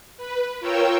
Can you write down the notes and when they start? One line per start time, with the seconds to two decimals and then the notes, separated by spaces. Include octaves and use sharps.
0.17 B4
0.60 F4 A#4 C#5 G5 E6